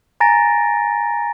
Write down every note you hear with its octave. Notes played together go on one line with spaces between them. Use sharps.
G#5 A#5 A6 A#6 D7